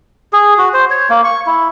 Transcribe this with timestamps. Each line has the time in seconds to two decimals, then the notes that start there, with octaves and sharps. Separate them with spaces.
0.33 G#4
0.58 F#4
0.74 C5
0.90 C#5
1.10 A#3
1.24 C#6
1.47 E4